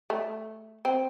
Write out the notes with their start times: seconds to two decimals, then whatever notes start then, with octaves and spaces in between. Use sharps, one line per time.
0.10 A3
0.85 C4